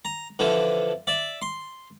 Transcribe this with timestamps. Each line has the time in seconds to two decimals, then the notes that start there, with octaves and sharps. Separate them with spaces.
0.05 A#5
0.39 D3 E3 F3
1.07 D5 E5
1.42 C6